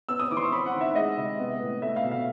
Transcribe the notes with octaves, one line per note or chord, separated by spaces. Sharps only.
B3 E6
D#6
E3 D6
C6
C#6
C4 B5
F#5
D#3
E5
G#3 D#5
C3
B3
A2
A3 E5
F5
B2
F5